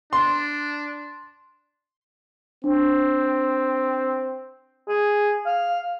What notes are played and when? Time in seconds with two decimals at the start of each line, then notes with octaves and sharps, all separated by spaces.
0.13 D4 C6
2.64 C4 D4
4.88 G#4
5.47 F5